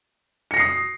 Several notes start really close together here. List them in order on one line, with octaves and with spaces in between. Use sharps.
C#7 A#6 C7 D#6